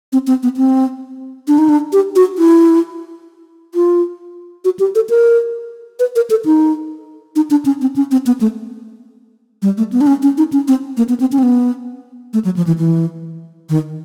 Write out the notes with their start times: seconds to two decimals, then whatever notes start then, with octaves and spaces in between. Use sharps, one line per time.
0.13 C4
0.27 C4
0.43 B3
0.57 C4
1.48 D4
1.58 D#4
1.69 D4
1.93 G4
2.16 F#4
2.38 E4
3.75 F4
4.65 F#4
4.79 G4
4.95 A4
5.10 A#4
6.00 B4
6.16 A#4
6.30 A4
6.45 D#4
7.36 D#4
7.51 D4
7.65 C#4
7.81 C4
7.96 C#4
8.11 C4
8.26 B3
8.41 A3
9.62 G3
9.78 A3
9.92 B3
10.01 D4
10.07 C#4
10.22 C#4
10.38 D#4
10.53 C#4
10.68 C4
10.97 A#3
11.09 B3
11.20 C4
11.32 C#4
11.39 C4
11.43 B3
12.33 A3
12.45 F#3
12.57 F3
12.67 E3
12.78 E3
13.69 D#3